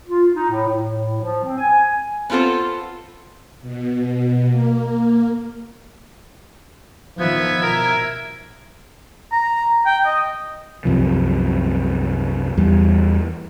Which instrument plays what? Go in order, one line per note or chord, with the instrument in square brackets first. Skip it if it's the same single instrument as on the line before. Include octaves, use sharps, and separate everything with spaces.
[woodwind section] F4
D#4
A2
A2
F3
C4
G#5
[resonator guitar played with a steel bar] B3 C4 F4 A4 C5
[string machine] B2
A#3
[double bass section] D#3 F3 [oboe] B3 [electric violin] E5 G#6
[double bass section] B2 [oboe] A#4
[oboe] A#5
G5
D#5
[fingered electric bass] C2 F#2 C3 F3
E2 G3